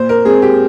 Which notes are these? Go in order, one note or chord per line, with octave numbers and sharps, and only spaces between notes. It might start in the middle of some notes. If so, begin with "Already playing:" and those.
Already playing: A#2 C5
A#4
G#3 C4 G#4
G4